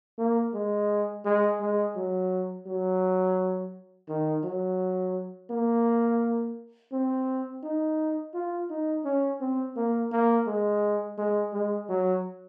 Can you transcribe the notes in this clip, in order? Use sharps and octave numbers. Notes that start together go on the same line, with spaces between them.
A#3
G#3
G#3
G#3
F#3
F#3
D#3
F#3
A#3
C4
D#4
F4
D#4
C#4
C4
A#3
A#3
G#3
G#3
G#3
F#3